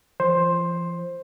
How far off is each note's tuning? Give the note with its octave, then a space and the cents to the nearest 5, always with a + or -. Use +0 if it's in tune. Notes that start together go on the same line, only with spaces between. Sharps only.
F3 -40 C5 +10